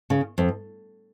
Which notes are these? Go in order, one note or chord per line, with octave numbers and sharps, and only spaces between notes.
C#3
F2